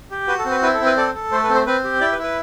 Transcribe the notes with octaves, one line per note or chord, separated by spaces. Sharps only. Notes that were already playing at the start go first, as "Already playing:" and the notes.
G4
F#4 B4
A4
C4
B4
E4 B4
A4
C4
B4
A4 D5
A4
A3 C5
B4
C4
C5
C4 B4
G4
E4 D5
B4
E4
B4